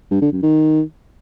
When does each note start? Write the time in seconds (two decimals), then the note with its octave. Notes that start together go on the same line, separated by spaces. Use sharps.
0.11 G2
0.21 D3
0.32 F#2
0.43 D#3